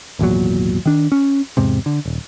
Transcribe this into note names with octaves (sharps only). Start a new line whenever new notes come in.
G#1 E2 A#2 F#3
D#3 D4
C#4
E2 G#2 C3
D3
D#1